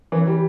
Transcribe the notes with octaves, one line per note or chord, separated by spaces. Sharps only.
E3
G3